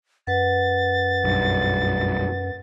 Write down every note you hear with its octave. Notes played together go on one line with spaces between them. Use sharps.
F#2 B4 F#5 A6
B1 G2